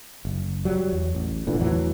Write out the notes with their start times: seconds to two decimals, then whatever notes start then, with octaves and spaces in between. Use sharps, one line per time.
0.25 F#1
0.65 F#3 G3
0.92 E2
1.15 A1
1.47 D1 A#2 D3 E3
1.59 E2 A2 E3 F#3